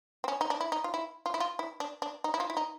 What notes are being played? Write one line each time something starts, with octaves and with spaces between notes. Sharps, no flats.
C4
C#4
D#4
D4
E4
D#4
F4
E4
F4
E4
F4
E4
D4
D4
D#4
E4
F4
E4
D#4